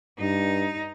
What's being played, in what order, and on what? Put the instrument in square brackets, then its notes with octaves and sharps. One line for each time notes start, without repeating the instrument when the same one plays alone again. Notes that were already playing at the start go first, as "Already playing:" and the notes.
[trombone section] G2 [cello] D#4